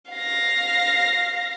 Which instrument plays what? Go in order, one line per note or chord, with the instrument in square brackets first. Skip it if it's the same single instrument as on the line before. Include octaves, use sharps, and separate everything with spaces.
[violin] F5 A#6